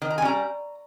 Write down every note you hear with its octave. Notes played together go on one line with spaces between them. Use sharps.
D#3
A#5
G#5
G3 C#4 A#5